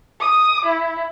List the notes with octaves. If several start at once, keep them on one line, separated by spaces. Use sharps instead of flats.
D#6
E4